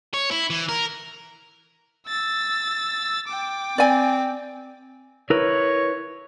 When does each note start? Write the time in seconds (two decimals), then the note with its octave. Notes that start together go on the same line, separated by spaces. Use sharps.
0.14 C#5
0.31 E4
0.50 E3
0.69 A#4
2.08 E6 A6
3.27 G5 D6
3.78 C4 D5 G#5
5.30 E4 A#4 B4 C#5